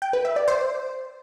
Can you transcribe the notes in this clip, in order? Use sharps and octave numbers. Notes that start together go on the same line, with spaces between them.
G5
B4
E5
D5
C5